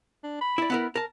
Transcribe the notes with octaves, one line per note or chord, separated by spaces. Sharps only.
D4
B5
E4 D5
B3 E4 A#4
A#4 A5